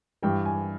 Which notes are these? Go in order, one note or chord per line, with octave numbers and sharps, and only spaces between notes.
G2 E3 G5
G#5